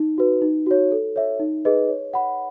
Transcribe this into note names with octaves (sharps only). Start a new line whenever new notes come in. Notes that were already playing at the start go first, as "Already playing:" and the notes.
Already playing: D#4
F#4 B4
D#4
F#4 C#5
A4
C#5 E5
D#4
G#4 B4 D#5
C#5
F#5 B5